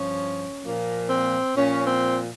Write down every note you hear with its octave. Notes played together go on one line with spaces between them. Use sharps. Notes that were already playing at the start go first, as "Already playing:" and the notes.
Already playing: G2 F3 C#4
A#2 F3 A#3
C4
A#2 F3 C#4
C4